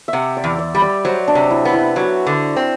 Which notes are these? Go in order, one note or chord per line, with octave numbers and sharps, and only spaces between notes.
E5
C3 F#5
D5
E2
D5
G3
D5
F#3 C5
D4
C3
E4
B3
E4
F#3 F#4
D3
C4